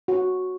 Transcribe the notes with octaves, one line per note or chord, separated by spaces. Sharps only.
F#4